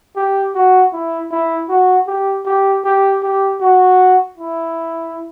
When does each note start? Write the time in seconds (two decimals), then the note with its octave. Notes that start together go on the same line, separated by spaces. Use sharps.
0.16 G4
0.55 F#4
0.93 E4
1.31 E4
1.69 F#4
2.07 G4
2.46 G4
2.85 G4
3.22 G4
3.61 F#4
4.38 E4